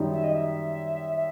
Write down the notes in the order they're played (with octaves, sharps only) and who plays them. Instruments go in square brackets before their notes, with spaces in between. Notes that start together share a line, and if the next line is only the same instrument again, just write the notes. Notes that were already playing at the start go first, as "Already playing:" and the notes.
Already playing: [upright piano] F#2 D#3 G3 D#4
[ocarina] E5
D#5
E5
E5